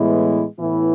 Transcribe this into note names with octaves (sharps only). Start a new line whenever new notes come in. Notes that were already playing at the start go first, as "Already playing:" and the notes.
Already playing: A2 E3 G#3 B3 E4
A2 E3 B3 E4